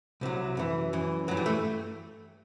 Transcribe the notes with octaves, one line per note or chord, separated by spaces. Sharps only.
C2 C3 F#3
F#2 E3
F#2 E3
G2 E3 F#3
G3
A3